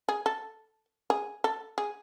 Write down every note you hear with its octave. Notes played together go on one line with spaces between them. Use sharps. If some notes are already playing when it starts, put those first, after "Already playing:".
G#4
A4
G#4
A4
G#4